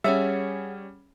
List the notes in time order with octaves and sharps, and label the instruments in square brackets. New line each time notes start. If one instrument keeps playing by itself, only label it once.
[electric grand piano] G3 C#4 [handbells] G#4 C#5 F#5 [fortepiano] E5